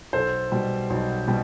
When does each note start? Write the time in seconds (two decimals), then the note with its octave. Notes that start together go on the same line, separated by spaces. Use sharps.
0.13 B1 A4 C5
0.52 B2 G3
0.90 B1
1.28 B2 G3